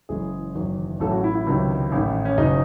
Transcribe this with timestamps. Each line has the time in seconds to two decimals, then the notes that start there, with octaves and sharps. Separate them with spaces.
0.09 F#1 F#2 E3 G#3 G#4
0.55 F#1 E2 D#3 F#3
1.00 A1 A2 F#3 A4
1.11 F#4
1.24 E4
1.35 E4
1.47 C#2 C3 D#3 F#3
1.92 A1 G#2 D#3
2.25 C#4
2.37 F#1 F#2 C#3 F#3 D#4